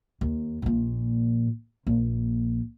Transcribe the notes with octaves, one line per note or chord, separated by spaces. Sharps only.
D#2
A#1 A#2
A#1 A#3